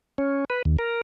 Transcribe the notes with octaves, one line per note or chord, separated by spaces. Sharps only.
C#4
B4
D#2
A#4